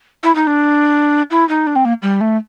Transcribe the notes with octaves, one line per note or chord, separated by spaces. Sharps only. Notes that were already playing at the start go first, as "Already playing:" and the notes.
E4
D#4
D4
E4
D#4
D4
C4
A#3
G3
A3